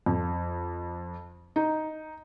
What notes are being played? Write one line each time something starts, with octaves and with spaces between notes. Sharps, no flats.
F2
D#4